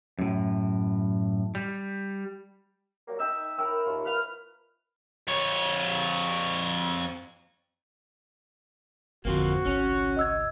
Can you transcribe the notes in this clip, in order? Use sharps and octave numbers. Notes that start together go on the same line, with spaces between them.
F#2 A2
G3
F#3 G3 A#3
D#4 E5 G5 E6
E4 A#4 C#5 G5 E6
D#2 F4
B4 F6
F2 C#5
G#1 F2 D3 A#3 C4 F4 F#4
G#1 C#2 C#4 C#5
D#5 E6 G#6